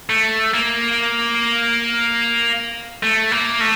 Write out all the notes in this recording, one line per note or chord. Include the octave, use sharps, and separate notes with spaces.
A3
A#3
A3
A#3
A3